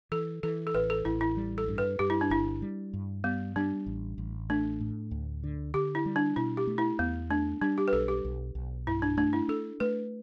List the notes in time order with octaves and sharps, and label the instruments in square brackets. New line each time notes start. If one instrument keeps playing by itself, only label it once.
[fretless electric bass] E3 [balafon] A4
[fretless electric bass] E3 [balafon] A4
[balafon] A4
[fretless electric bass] A1 [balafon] B4
[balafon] A4
[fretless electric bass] A1 [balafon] E4
[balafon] E4
[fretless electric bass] G3
[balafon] A4
[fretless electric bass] G2
[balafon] B4
[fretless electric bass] G2 [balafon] G4
[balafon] E4
D4
[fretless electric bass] G1 [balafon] E4
[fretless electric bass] G3
G2
[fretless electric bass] G3 [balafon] B3
[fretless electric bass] G3 [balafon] D4
[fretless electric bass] A1
A1
[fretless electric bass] A3 [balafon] D4
[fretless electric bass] A2
D2
D3
[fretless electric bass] D3 [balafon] G4
[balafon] E4
[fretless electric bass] G3
[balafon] D4
[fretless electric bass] B2 [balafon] E4
[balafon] G4
[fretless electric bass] A3
[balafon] E4
[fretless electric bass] E2 [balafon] B3
[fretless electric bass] A3 [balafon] D4
[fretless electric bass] G3 [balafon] D4
[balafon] G4
B4
[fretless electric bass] B1 [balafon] A4
[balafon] G4
[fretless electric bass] B1
B1
[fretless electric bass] G2 [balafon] E4
[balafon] D4
[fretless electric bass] A3 [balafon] D4
[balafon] E4
[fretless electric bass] D4 [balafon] A4
[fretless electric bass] A3 [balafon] B4